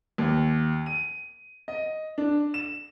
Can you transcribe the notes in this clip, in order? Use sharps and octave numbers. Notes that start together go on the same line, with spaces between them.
D#2
D#7
D#5
D4
E7